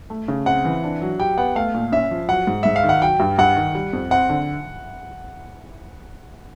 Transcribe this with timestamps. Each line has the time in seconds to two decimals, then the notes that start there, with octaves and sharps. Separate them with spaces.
0.10 A3
0.28 C#3
0.46 C4 F#5
0.65 E3
0.84 D4
1.02 F#3
1.19 G4 G5
1.38 B3 F#5
1.56 A3 F5
1.74 A#2
1.92 C#4 E5
2.11 F3
2.29 F#3 F#5
2.47 G#2
2.63 G#2 E5
2.76 F5
2.84 D#3
2.89 F#5
3.02 F#3 G5
3.20 G2
3.38 G2 F#5
3.57 D#3
3.75 G3
3.93 F2
4.11 C4 F#5
4.29 D3